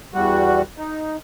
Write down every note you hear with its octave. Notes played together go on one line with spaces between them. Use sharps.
E2 G3 F#4
D#4